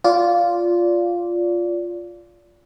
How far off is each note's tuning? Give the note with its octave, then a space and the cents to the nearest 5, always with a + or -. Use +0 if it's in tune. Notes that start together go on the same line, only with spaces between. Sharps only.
F4 +0 D5 -20